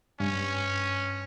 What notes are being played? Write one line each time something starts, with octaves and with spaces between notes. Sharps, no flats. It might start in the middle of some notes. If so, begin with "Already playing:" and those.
G2 C#4